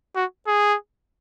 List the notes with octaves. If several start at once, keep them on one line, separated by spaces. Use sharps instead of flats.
F#4
G#4